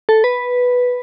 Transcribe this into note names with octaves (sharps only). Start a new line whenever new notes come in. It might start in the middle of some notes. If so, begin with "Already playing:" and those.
A4
B4